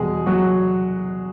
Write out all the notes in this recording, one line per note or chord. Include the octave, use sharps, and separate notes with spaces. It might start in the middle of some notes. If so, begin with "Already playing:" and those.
Already playing: E2 B2 G3 G#3 G#4
F#3 F#4